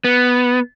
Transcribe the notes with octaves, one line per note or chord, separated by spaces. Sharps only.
B3